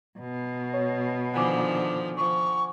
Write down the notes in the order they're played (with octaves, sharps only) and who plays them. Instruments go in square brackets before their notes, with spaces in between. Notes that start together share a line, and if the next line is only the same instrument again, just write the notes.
[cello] B2
[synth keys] C#5
[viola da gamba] D3 D#3 F3 [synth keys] F#5 G#5 D6
[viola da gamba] F3 [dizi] C#6